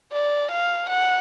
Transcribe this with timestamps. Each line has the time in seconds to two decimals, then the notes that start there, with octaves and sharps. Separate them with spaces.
0.13 D5
0.52 F5
0.89 F#5